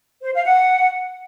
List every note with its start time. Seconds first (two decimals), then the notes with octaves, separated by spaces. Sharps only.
0.23 C5
0.34 F5
0.45 F#5